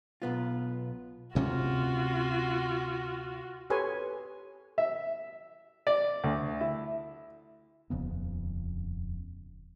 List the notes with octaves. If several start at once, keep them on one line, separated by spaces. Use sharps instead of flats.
B1 B3 F4
D2 C3 C#4 F4 F#4
G4 A4 B4 C#5 G#5 C6
E5
D5
D2
E4
D#1 F2 C#3 B3